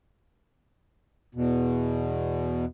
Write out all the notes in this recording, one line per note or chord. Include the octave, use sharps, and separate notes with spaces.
E2 B2